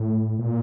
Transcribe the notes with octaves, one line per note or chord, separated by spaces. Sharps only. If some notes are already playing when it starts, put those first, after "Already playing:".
Already playing: A2
A#2